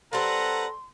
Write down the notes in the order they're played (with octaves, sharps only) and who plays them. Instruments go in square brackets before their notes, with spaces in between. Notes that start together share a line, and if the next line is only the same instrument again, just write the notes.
[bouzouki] G3 C4 [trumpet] A4 [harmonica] B4 F#5 A#5 [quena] C6